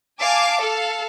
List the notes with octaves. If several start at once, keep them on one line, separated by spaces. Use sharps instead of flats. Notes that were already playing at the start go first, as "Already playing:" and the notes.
F5 G#5 A5 D6
A4 F5